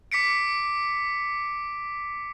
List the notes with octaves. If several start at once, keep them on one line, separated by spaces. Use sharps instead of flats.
D6 B6 C#7 D7